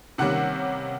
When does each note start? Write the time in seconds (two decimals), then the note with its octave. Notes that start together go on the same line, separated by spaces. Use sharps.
0.18 C3 D#3 G3 A#3 C#4 F#5